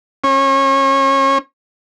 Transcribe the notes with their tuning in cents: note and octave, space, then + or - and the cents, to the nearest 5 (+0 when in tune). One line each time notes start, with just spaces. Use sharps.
C#4 -30